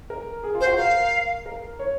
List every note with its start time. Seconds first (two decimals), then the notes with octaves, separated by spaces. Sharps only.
0.10 A#4
0.44 G#4
0.55 F4
0.61 C5
0.67 F#4
0.77 A#4 F5
1.46 A#4
1.79 C#5